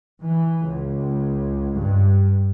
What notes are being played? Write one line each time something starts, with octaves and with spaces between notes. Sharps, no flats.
E3
C#2
G2